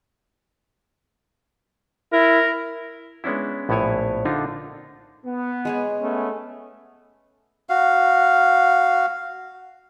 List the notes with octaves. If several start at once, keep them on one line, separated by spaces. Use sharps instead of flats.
E4 A#4
G#3 B3 C#4 D4 E4
A#1 A2 B3 E4 C#5 G#5
D3 D4 D#4 F4
B3
G#3 G#4 C#5
A3 B3 C#4
F#4 F5